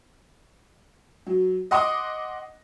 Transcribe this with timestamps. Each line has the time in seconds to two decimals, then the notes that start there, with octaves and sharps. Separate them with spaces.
1.27 F#3
1.71 D#5 F#5 C6 D6 D#6